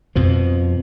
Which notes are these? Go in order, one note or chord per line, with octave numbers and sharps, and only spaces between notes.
F2 B2 F3